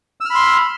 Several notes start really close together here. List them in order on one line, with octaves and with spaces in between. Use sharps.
E6 F6 B5 C6